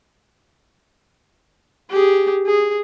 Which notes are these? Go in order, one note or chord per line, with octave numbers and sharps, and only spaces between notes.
G4 G#4
G#4